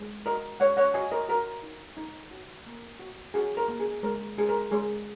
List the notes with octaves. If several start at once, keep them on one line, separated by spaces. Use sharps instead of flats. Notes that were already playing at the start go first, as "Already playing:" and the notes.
Already playing: G#3
F#4 A#4 D#5
G#3 C#5 F#5
C#5 F#5
F#4 D#5 G#5
A#4 D#5
F#4 A#4
D#4
D#4
F#4
A#3
F#4
F#4 G#4
A#4
A#3
G#4
G#3 A#4
G#3 G#4
A#4
G#3 G#4